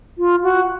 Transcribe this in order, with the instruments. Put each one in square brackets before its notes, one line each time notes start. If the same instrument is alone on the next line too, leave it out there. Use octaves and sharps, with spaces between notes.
[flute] F4
F#4